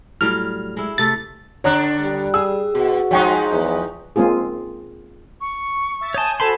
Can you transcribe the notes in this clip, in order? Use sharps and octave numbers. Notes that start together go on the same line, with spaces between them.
A2 F#3 G3 F6
G#3 E4
C3 A3 A4 A6
D3 D4 C#5 A#5 F#6
G3
G#4 E6
B2 F#4
F3 G#3 D#4 C#5 G5 C#6
E2
G#3 A#3 C4 F4 G#4
C#6
E5 A6
C#5 G#5 A5 D#6 G6
F#4 A4 C5 G#5 A5 B5 C6